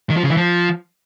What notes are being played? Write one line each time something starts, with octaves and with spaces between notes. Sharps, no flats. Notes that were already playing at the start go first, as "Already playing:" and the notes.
D#3
F3
C#3
E3
F3